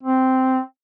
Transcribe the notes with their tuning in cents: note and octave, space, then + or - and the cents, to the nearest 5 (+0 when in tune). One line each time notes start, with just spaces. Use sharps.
C4 -5